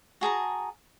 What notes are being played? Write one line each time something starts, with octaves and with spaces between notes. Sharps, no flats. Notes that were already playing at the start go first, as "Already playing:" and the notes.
F#4 G#4 A5 A#5